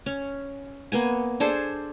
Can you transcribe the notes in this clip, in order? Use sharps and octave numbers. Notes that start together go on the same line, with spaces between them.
C#4
A#3 B3 G#5
D4 G#4 A4 C5